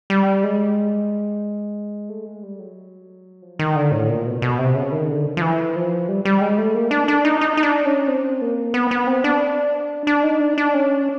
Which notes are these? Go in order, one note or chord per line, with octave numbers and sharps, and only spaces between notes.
G3
G#3
A3
G#3
G3
F#3
F3
D#3
D3
A2
A#2
B2
B2
C3
C#3
D#3
D3
F3
E3
F3
G3
G3
G#3
A3
A#3
D4
D4
D#4
D#4
D#4
D4
C#4
C4
A#3
B3
B3
C4
D4
D4
D#4
D4
D4
C#4